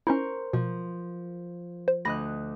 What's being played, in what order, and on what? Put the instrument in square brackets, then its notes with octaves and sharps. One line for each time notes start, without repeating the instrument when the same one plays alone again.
[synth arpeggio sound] C#4 D#4 E4 [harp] A#4 C5 C#6
[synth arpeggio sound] B2 [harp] F3
[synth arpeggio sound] C5
[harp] D2 D#5 F#6 [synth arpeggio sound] B5 A#6